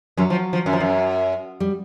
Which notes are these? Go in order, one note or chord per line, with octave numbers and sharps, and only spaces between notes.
F#2 F#3
F3
F3
F#2
F3
F#2
G3